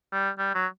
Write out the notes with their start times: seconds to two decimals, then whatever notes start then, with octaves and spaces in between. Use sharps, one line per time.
0.12 G3
0.38 G3
0.54 F#3